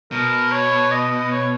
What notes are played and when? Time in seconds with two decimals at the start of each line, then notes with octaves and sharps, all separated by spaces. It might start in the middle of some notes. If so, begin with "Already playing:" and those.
0.12 B2 A#4
0.52 C#5
0.92 D#5
1.11 D#5
1.31 C#5